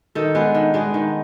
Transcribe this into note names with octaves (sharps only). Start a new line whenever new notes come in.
D#3 A4
G#3 B3 D4
D#3
G#3 B3 D4
D#3